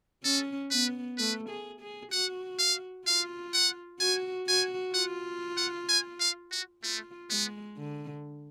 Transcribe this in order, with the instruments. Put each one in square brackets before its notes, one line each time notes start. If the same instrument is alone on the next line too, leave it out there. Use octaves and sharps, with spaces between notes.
[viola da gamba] C#4 [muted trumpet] A4
[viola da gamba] B3 [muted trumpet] B4
[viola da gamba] A3 [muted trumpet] B4
[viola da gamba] G#4
G#4
[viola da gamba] F#4 [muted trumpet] F#5
[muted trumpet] F5
[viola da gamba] F4 [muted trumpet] F5
[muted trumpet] F#5
[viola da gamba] F#4 [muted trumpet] G#5
[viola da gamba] F#4 [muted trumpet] G#5
[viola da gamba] F4 [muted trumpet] F#5
[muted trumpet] F#5
G#5
F5
F#4
[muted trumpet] A3 [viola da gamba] F4
[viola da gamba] G#3 [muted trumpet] B3
[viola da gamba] D3